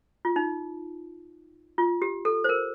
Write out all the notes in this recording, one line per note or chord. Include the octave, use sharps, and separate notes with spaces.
F4
D#4
F4
G4
A4
C5
A#4